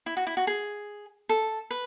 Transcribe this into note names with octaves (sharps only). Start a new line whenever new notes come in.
E4
F#4
E4
F#4
G#4
A4
B4